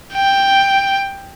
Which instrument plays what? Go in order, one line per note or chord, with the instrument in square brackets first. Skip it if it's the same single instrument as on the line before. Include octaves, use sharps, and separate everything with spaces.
[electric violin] G5